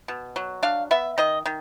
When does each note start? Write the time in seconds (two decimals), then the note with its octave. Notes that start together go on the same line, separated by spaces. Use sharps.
0.08 B2
0.36 F#3
0.63 D4 F5
0.91 B3 E5
1.18 D#3 D#5
1.46 D#3